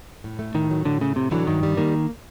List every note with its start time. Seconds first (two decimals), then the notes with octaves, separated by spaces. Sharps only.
0.24 A2
0.39 A3
0.54 A2 D#3
0.71 F#3
0.85 A2 D3
1.01 C#3 A3
1.16 A2 C3
1.31 D3 E3 F#3
1.47 G2 D#3
1.63 G3
1.77 D#3 A#3